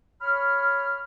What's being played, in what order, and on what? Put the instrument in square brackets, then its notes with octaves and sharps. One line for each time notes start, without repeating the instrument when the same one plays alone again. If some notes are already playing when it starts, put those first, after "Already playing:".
[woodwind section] C#5 B5 F6